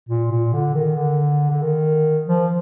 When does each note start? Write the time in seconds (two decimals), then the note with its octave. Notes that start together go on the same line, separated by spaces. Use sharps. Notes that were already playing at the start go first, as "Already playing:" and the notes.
0.09 A#2
0.31 A#2
0.53 D3
0.75 D#3
0.97 D3
1.50 D3
1.62 D#3
2.28 F3